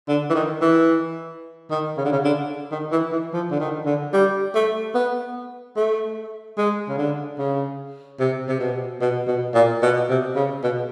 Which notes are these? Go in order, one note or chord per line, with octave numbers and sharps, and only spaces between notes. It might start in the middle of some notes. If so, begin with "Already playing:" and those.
D3
E3
D#3
E3
D#3
C#3
D3
C#3
D3
D#3
E3
E3
F3
D3
D#3
D3
G3
A3
B3
A3
G#3
C#3
D3
C#3
C3
C3
B2
B2
B2
A#2
B2
C3
C#3
B2